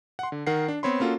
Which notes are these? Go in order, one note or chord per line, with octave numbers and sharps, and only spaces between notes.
F#5 C6
D3
D#3 A#4 F#5 C7
D4
B3 C4 C#5 B5 C6
A#3 C#4 F4 F#4 A4